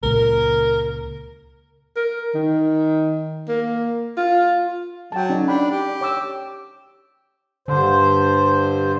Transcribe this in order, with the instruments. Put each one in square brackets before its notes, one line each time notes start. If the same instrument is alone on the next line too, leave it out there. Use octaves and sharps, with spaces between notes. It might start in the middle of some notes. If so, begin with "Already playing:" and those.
[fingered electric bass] C#2 A#2 [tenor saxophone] A#4
[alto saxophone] A#4
D#3
A#3
F4
[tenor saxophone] F#3 [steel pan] G5 A5
[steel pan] C#4 D#4 D5
[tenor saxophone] D4 [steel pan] F#5 G5 B5
[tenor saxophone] G4
[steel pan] C#5 D6 E6
[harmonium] G2 C5 [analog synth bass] D3